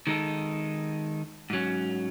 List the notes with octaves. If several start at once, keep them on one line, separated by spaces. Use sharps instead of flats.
D#3 G#3 D#4 A4
G#2 F#3 C#4